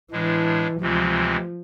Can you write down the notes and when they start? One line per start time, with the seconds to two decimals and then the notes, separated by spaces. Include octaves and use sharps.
0.11 A2 E3 G#3 D4
0.81 D2 C3 E3 F3 G#3 C4